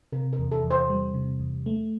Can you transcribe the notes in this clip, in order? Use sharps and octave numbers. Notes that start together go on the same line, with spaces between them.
C3 A#4
A#4
E2
A4
E2
C5
G3
C3
E2
A3